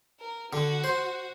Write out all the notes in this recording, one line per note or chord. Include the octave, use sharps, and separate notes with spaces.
A#4
D3 F#4
C5